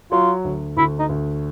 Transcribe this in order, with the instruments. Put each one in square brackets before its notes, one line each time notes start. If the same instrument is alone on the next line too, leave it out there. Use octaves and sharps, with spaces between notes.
[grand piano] F#3 [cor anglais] F4
[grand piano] D2
[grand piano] D2 [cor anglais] E4
[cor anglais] D#4
[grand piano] D2